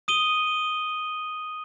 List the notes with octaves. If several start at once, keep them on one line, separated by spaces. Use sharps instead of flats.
D#6 D#7 G7